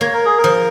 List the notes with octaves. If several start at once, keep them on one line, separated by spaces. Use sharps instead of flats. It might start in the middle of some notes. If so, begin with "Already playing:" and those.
A#3 C#5
A#4
G#4
A#4
F3